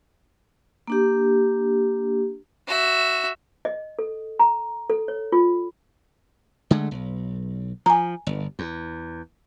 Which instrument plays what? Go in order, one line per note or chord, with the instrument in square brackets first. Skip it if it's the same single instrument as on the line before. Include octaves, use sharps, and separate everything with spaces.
[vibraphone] A#3 D4 G4
[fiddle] F#4 E5
[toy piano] D#5
A4
A#5
A4
C#5
F4
[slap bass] D3 G#3 A3
B1
[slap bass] F3 [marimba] G#5 A#5
[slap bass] G1
E2